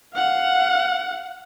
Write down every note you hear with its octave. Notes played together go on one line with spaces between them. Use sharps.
F5 F#5